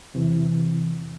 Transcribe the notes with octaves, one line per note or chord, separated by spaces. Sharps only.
E2 C3 E3